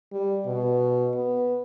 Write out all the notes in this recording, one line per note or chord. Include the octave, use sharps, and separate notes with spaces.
G3
B2
B3